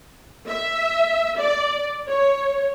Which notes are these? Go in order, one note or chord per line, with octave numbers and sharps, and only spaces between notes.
E5
D5
C#5